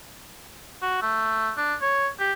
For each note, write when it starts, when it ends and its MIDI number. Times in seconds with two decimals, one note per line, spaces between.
0.82 1.02 66
1.02 1.52 57
1.57 1.75 62
1.82 2.09 73
2.19 2.33 67